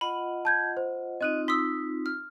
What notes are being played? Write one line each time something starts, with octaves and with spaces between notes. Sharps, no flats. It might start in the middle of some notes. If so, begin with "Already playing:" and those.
F4 D#5 F#5 B5
A5 G6 G#6
C5
C4 D#4 F4 D#5 F#6 D#7
C6 D#6 E6 B6
F6